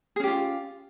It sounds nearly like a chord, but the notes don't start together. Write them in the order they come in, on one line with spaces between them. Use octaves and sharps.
G#4 C#4 G4 F4